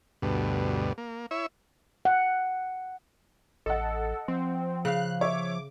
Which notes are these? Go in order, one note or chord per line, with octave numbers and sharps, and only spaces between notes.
D2 G2 B2
A#3
E4 C#5 E5
F#5
A1 A4 D#5 F#5
F3 C4
C#3 F5 F#6
C#5 E5 D6